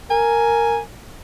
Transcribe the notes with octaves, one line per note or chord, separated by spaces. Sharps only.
A#4 G#5